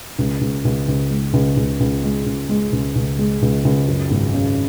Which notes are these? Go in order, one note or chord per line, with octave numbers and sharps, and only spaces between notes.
C#2
C#2
C#2
C#2
G#3
C#2
C#2
C#2
G#3
C#2
G#3
C#2
C#2
G#3
C#2
C#2
F#2
G#1
C#3